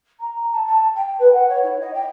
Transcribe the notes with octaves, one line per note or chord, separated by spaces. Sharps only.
A#5
A5
A5
G5
B4
F#5
C#5
E4
D#5
G5